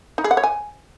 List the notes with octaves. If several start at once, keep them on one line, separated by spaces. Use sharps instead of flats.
D#4
G#4
F#5
C#5
G#5